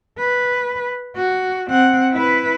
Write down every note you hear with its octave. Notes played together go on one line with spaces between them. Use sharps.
B4
F#4
C4 F#5
E4 B4